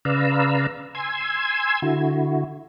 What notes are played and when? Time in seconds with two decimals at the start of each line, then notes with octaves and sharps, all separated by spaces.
0.05 C#3 B4 D5 F5 A#5 E6
0.95 G#5 C6 E6 G#6
1.82 D3 E4 F#4